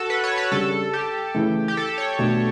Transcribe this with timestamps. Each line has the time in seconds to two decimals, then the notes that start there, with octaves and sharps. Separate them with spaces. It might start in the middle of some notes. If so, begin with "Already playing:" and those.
Already playing: F#4 A4
0.10 B4
0.24 C#5
0.38 B4
0.52 C#3 G3 D4 A4
0.93 G4
1.35 C#3 E3 A3
1.68 G4
1.77 A4
1.98 C#5
2.19 B2 A3 D4